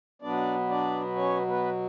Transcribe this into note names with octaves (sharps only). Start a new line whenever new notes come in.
B2 F#3 B3 D4 D5
D4 D5
C#4 C#5
B3 B4